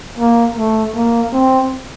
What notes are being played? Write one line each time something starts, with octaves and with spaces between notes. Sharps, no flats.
A#3
A3
A#3
C4